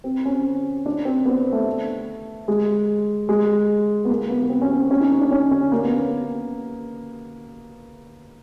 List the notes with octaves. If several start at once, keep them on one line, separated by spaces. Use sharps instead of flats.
C4
C#4
D4
C4
B3
A3
G#3
G#3
B3
A#3
B3
B3
C4
C#4
C4
C#4
D#4
D#4
D4
C#4
C#4
A#3
B3